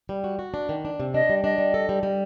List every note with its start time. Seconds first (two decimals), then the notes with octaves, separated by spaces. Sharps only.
0.09 G3
0.24 F#4
0.39 F#4
0.54 D4
0.69 D#3
0.85 D4
1.00 C3
1.14 D4 D#5
1.29 G3
1.44 D4 D#5
1.58 G3
1.74 A4
1.89 G3
2.03 G3